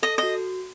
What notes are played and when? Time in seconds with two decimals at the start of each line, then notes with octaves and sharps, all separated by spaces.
0.03 A4 D#5
0.18 F#4 D#5